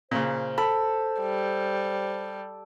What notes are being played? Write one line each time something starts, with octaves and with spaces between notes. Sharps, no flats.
A#2 C#3 C5
A4 B5
G3